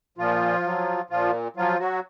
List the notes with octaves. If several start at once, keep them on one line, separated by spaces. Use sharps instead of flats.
A#2 F3 F4
F#3
A#2 F3 F4
F3 F#3 F4
F#3 F#4